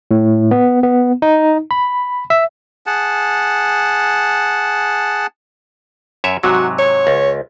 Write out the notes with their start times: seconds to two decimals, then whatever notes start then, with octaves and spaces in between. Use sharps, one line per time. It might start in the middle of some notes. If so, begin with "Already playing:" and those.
0.11 A2
0.51 B3
0.83 B3
1.22 D#4
1.71 B5
2.30 E5
2.86 G#4 F#5 A5
6.24 F#2 C#5 E5
6.44 G#2 C3 F#3 F#4
6.79 C#5
7.07 C#2